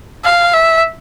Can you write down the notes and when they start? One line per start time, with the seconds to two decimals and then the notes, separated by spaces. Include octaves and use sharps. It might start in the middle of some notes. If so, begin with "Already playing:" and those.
0.24 F5
0.53 E5